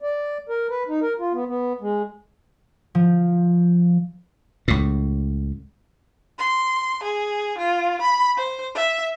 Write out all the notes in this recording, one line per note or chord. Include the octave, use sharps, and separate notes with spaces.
D5
A#4
B4
D#4
A#4
F4
B3
B3
G#3
F3
C#2 A2
C6
G#4
F4
B5
C5
E5